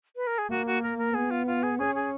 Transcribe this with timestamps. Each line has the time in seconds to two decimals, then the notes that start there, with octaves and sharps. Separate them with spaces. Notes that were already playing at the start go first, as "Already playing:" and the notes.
0.16 B4
0.27 A#4
0.38 G#4
0.50 A#3 F#4
0.66 F#4
0.82 A#4
0.98 A#4
1.14 B3 G#4
1.30 F4
1.47 F4
1.63 G#4
1.79 C#4 G#4
1.95 G#4